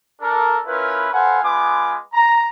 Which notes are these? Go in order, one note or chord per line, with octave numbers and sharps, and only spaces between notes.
D4 A4 A#4
C#4 E4 F4 A#4 B4
A4 B4 C5 F5 F#5 G#5
G#3 B3 F4 B4 G#5 D6
A#5